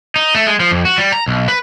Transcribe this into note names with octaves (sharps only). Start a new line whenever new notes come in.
D#4
A3
G#3
F3
F2
F#4
G3
A#5
B1
B4